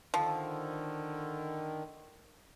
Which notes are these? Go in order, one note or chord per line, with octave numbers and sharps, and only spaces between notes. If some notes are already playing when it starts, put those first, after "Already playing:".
D3 D#3 F3